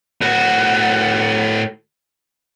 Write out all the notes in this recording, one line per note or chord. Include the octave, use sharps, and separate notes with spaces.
A2 F#4